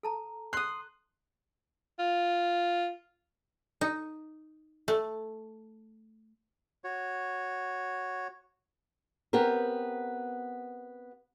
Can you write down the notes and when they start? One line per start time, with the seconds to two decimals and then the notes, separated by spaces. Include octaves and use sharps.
0.03 A4 A5 A#5
0.53 C6 D#6 F#6
1.99 F4
3.81 D#4
4.88 A3
6.84 F#4 C#5
9.33 B3 C4 G4 A#4